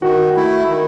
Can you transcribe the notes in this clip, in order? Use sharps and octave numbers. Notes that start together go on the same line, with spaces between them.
D#3 F#4
A3 E4
D#3